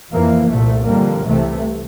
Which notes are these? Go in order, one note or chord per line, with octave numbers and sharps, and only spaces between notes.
F2 E3 A#3
C2 A#2 A3
F2 D3 G3 A#3
C2 C3 E3 A3